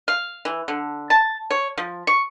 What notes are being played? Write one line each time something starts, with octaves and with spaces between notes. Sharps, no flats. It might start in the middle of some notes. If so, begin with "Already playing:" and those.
F5
E3
D3
A5
C#5
F3
C#6